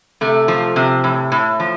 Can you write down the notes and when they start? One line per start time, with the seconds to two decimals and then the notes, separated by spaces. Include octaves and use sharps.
0.21 C3 A3
0.48 F3
0.76 C3
1.04 A2
1.32 A2
1.60 F3